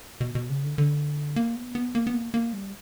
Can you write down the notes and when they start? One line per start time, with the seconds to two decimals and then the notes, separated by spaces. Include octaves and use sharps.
0.21 B2
0.35 B2
0.50 C#3
0.64 D3
0.78 D3
1.36 A#3
1.56 B3
1.75 B3
1.95 A#3
2.07 B3
2.14 A#3
2.34 A#3
2.53 G3